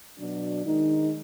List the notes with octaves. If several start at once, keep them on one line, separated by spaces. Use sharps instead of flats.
B2 F#3 D4
D#3 G#3 D#4